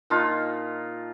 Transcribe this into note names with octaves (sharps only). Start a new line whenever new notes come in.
A#2 D#4 F4 A5